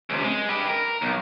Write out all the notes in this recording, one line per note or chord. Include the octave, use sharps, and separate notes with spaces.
C#2 C3
G#3
G4 B4
A#4
B1